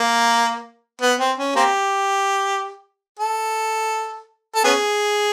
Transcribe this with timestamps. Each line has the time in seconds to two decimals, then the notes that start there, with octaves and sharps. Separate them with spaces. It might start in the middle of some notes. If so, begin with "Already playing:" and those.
Already playing: A#3
1.01 B3
1.19 C4
1.38 C#4
1.56 A#3 C4 G4
3.20 A4
4.55 A4
4.64 B3 C#4 G#4